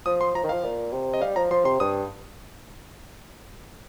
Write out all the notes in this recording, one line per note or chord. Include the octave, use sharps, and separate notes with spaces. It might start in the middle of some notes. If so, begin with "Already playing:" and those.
F3 D#6
C6
F3 A#5
D#3
F3 F5
A#2
C3
D#5
G3 F5
F3 A#5
F3 C6
C3 C6
G2 D#6